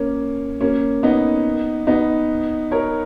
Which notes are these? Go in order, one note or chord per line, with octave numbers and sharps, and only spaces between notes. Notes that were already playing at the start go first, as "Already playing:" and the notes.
Already playing: A#3 C#4
A#3 C#4
B3 D#4
B3 D#4
A#4 C#5